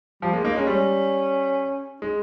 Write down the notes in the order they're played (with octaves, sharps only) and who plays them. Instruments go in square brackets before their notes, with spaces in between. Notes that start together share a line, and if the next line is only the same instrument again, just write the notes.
[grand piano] F3 [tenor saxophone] G3
[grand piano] G#3 [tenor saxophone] A#3
[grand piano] A#3 [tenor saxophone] D#4
[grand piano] G#3 [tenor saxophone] C#4
[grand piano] G3 [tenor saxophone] C#4
[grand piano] G#3 [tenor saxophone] D#4